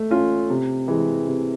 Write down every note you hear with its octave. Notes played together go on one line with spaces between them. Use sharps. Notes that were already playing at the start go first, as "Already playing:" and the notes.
Already playing: A3
C#4 F4 A4
C3
E3 G#3
C3